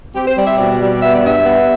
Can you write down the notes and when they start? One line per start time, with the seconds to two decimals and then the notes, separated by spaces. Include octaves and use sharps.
0.15 C4 G4
0.26 C5
0.37 G3 D5
0.47 E5
0.58 B2 D5
0.80 G3
1.01 B3 E5
1.14 D5
1.24 G2 E5
1.45 B3